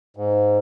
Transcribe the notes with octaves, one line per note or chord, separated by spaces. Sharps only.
G#2